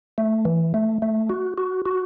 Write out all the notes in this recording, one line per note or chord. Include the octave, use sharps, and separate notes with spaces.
A3
E3
A3
A3
F#4
F#4
F#4